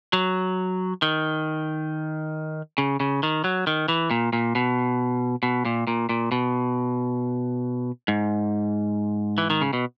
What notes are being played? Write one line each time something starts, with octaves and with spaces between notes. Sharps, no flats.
F#3
D#3
C#3
C#3
D#3
F#3
D#3
E3
A#2
A#2
B2
B2
A#2
A#2
A#2
B2
G#2
E3
D#3
C#3
B2